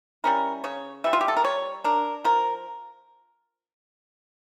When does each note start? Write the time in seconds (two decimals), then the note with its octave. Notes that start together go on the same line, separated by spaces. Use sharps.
0.24 G3 C#4 E4 A#4
0.64 C#3 C#5
1.04 E3 G3 E5
1.13 F4
1.21 G4
1.28 A4
1.37 A#4
1.44 G3 C#5
1.84 D4 A#4
2.24 F3 A#4